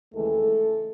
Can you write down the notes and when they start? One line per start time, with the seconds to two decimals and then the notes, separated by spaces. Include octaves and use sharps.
0.14 D#2 C#3 E3 G#3 A3 A4